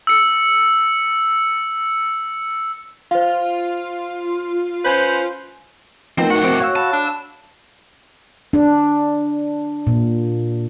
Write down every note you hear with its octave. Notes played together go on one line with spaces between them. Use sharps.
E6 C#7
F4 C5 F5
C#4 B4 C5
F3 A3 B3 C4 D#4 A#4
A2 F#4 F#5
C4 D6
C#5 F5 E6
A5 B5
D4
D4
A#2